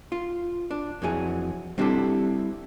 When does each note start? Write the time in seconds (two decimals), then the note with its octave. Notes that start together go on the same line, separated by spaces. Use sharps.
0.12 F4
0.71 D4
1.02 F2 E3 F#3 G#4
1.78 G3 C4 D4 E4 G4 A4